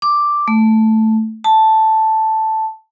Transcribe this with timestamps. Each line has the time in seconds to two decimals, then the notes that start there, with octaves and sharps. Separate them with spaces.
0.02 D6
0.48 A3
1.44 A5